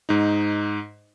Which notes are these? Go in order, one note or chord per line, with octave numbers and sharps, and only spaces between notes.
G#2 D#4